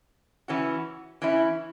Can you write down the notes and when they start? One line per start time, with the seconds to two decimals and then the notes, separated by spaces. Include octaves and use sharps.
0.48 E3 C#4 F#4
1.22 E3 C#4 E4